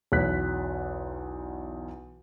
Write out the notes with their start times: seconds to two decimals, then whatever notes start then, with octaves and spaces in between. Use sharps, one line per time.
0.12 B1 E2 F#3 F#6 B6